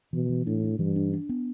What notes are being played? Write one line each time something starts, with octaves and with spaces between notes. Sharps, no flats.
B2 E3
E3
A2 D4
D4
G2 E3
D4
D4
B3